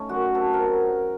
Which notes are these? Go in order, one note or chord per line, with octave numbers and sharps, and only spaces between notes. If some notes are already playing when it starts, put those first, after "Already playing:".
Already playing: A3 C#4 D#4
F#2 F#4
C3 A4
A#4
F#3